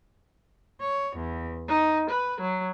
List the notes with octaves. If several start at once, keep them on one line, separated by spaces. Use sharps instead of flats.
C#5
E2
D#4
B4
F#3